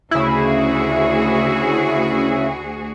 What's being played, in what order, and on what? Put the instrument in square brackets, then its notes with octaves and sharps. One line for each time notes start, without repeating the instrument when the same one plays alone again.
[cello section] D2 F#4 G#4 [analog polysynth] C#3 E4